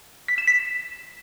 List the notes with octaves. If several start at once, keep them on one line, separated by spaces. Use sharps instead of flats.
B6
E7
B6